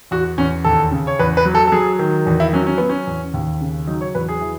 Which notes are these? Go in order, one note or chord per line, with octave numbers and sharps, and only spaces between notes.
E2 F#4
E2 C#4
D#2 A4
C#3
C#5
E2 B4
B4
F#3
A4
A4
F#3 G#4
D#3
E2
E4
F#3 C#4
C#4
F#3 B3
C#4
E2
D#2
C#3
F#3 D#4
C#5
E2 B4
G#4
E3